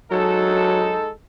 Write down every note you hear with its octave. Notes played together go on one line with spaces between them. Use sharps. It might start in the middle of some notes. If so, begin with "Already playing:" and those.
F#3 G#3 D#4 A4